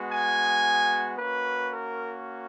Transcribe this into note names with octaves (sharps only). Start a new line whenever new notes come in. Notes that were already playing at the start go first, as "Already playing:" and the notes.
Already playing: G#3 B3 F#4
G#5
A#3 C#4 F#4 B4
A#4